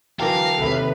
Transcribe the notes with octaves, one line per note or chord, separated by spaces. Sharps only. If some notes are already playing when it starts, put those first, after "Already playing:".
D3 E3 F#3 A#4 F5 G5 A5 C7
D#2 C3 A4 B4 E5